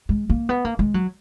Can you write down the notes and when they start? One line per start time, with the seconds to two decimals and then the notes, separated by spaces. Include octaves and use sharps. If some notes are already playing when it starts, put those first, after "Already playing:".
0.09 G#3
0.29 A#3
0.49 B3
0.65 A#3
0.79 G#3
0.94 F#3